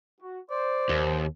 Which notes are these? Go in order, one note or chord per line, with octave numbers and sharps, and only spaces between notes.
F#4
C5 D5
D#2